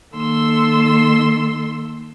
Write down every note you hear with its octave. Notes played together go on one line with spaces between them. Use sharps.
D#3 A#3 A4 C6 E6